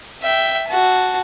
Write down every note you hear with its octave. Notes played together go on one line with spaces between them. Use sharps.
E5 G5
F#4 A5